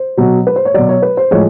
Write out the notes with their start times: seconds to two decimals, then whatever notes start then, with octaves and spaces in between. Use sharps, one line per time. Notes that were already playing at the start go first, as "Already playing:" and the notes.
Already playing: C5
0.17 B2 F#3
0.47 B4
0.56 C5
0.65 C#5
0.74 B2 F#3 D5
0.89 C#5
1.02 B4
1.17 C5
1.31 A2 F3 G#3 C#5